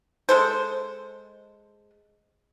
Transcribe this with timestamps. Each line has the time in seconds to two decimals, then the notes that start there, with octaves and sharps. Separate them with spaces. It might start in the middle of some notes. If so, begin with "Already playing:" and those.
0.29 G#3 A4 C5